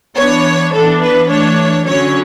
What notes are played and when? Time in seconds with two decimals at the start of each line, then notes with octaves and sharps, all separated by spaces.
0.17 E3 B3 D4 C#5
0.73 E3 B3 D4 A4
1.02 B4
1.30 E3 A3 D4 C#5
1.87 D3 F#3 C#4 C#5